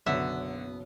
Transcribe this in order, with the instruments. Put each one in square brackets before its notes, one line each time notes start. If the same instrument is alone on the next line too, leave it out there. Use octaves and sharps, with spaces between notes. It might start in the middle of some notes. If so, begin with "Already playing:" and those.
[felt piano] F#1 B1 [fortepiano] D3 F#3 [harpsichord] B3 [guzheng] E5